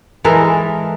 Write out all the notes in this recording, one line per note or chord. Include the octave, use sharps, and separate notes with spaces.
E3 G#3 A4 A#4